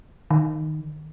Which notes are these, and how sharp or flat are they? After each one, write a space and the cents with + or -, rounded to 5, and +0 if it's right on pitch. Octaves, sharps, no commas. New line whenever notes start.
D#3 -10